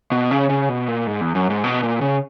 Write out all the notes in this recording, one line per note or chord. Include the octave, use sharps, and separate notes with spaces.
B2
C#3
C#3
B2
A#2
G#2
E2
F#2
G#2
B2
A#2
C#3